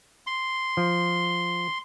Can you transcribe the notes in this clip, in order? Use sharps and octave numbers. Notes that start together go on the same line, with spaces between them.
C6
F3